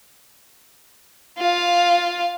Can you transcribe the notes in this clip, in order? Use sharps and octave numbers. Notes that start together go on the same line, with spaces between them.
F4 F5